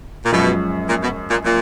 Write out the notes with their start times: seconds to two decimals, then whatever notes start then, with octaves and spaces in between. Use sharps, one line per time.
0.25 A#2
0.32 F#2 B2 F3 G#3 C#4
0.88 A#2
1.02 B2
1.30 A#2
1.44 A#2